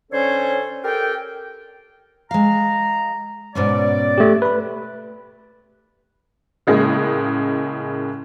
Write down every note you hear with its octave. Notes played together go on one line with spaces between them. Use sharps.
D3 C#4 A4 C5 C#5
G4 A4 A#4 G5
G#3 F5 A#5
G#2 B2 C#4 D5
A3 G4
B4 B5
A2 C#3 G#3 A#3